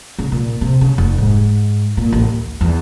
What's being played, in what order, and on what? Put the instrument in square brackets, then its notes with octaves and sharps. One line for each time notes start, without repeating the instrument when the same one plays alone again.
[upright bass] C#3
A#2
C3
C#3
F1
G#2
A#2
A1
D2
E2